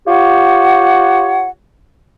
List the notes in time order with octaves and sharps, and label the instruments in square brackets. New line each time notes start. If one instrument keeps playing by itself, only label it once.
[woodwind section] F4 G4 C#5 F#5